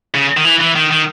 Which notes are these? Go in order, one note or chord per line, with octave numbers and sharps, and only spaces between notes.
C#3
D#3
E3
E3
D#3
D#3